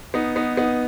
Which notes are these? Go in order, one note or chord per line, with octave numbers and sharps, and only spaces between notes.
B3 D#4
B3 D#4
B3 D#4